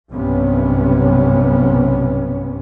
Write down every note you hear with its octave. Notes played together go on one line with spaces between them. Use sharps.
B1 G2 C3 B3 C#4